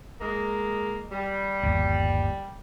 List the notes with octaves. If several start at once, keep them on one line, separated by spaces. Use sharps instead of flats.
G#3 A#3 D#5
G3
G1 D#2